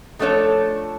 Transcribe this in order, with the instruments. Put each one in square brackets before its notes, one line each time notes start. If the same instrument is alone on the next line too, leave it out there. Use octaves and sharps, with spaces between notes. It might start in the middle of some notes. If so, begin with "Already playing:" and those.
[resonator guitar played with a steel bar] F3 A3 D4 A4 C#5